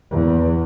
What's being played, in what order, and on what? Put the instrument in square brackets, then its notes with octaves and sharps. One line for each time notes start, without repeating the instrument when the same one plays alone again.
[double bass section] E2